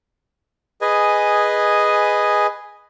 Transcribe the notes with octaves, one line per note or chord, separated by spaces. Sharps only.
G#4 B4 D#5 G#5